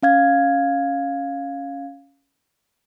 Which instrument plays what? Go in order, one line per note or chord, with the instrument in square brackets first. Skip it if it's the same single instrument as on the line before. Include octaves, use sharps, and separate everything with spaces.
[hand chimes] C#4 F5 G#6